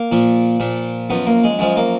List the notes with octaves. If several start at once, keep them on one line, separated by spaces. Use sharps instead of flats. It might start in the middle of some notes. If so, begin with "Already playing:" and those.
Already playing: A#3
A#2 F3
A#2 F3
F#2 F3 B3
A#3
G#3
F#2 F3 G#3
A#3